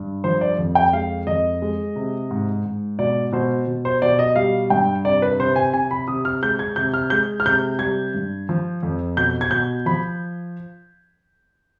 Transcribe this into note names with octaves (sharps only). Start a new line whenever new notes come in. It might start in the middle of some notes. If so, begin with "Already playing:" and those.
Already playing: G2
F3 C5
D5
F2
G5
G#3 F5
F2 D#5
G#3
C3
G#2
G#2
B2 D5
B2 C5
B2
C5
B2 D5
D#5
G3 F5
G2 G5
C3 D5
B4
C3 C5
G#5
C3 G#5
B5
C3 D#6
F6
G#3 G6
G#6
C3 G6
F6
G#3 G6
F6
C3 G6
G3 G#6
G2
F3
F2
B2 G6
G#6
B2 G6
F3 B5